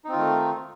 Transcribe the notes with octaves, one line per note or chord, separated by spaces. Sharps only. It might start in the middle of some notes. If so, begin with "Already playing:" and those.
D#3 A3 C4 D#4 F4